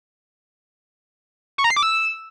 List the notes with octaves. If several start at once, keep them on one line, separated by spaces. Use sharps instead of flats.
C#6
A#5
C7
D6
E6